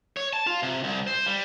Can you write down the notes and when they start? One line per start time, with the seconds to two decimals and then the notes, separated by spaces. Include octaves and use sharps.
0.17 C#5
0.33 A5
0.47 F4
0.63 C3
0.84 C2
1.07 C5
1.27 G3